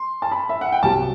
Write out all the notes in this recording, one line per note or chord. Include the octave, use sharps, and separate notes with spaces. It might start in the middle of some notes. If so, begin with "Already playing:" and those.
Already playing: C6
A5
B5
E5
F#5
G5
C2 C3 F#3 A5